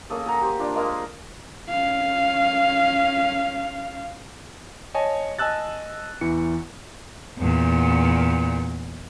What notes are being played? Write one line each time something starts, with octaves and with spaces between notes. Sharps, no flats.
A#3 C#4 G#4 A4
G#4 F#5 A#5
G4 C5
D4 F4
G#3 A#3 G#4 F5
C#4 F5
C#5 D#5 G#5 A5
D#5 G#5 A5 E6 F#6 A6
E2 E3 C#7
E2 A#2